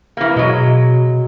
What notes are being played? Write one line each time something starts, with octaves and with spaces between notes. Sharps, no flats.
E3 A#3
B2 F#3 G#3